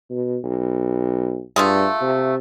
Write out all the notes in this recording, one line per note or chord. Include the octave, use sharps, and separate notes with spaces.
B2
B1
G2 A3 F4 G#4
C3